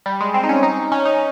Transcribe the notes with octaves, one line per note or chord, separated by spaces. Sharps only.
G3
G#3
C4
D#4
C#4
D#4
C#4
D#4